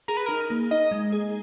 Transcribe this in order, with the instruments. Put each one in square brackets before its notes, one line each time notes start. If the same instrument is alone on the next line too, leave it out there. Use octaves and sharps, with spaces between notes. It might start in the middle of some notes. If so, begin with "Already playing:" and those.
[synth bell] G#4 [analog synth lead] A#4
[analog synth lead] B4
[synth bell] D#4 [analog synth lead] A#4
[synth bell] A#3
[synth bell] D#4 [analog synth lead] D#5
[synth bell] G#3
G#4